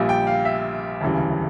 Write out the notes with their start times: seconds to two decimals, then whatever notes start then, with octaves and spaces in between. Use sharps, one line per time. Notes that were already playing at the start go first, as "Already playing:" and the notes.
Already playing: A#1 A#2 G3
0.09 G5
0.27 F5
0.45 E5
1.01 E1 D2 C#3 E3 G3